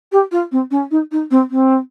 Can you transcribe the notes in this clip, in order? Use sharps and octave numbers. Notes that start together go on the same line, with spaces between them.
G4
F4
C4
C#4
D#4
D#4
C4
C4